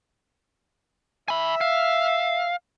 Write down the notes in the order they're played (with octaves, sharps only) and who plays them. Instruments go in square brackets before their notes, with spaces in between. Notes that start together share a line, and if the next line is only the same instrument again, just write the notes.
[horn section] E5 [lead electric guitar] G#5 B5
[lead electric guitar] F5